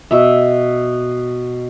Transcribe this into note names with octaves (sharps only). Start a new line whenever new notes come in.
B2 E5